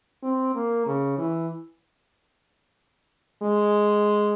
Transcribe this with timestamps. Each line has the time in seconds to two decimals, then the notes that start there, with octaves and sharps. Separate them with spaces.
0.23 C4
0.55 A#3
0.87 C#3
1.18 E3
3.43 G#3